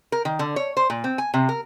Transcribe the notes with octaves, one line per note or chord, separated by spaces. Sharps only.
A#4
D#3
D3
C#5
C5
A#2
C4
G#5
C3
A#4